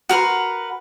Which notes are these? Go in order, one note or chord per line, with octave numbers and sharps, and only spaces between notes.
F#4 A#4 B4 C6